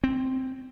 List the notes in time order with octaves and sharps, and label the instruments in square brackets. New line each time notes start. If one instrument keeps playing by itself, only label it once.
[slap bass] C4